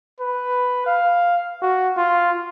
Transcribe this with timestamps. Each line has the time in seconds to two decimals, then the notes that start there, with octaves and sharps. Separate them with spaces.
0.20 B4
0.86 F5
1.62 F#4
1.97 F4